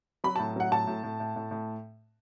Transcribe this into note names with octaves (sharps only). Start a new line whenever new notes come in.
F#3 B5
A2 A5
F#3 F#5
A2 A5
A2
A2
A2
A2
A2